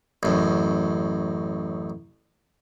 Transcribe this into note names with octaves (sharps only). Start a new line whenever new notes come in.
A1 F#2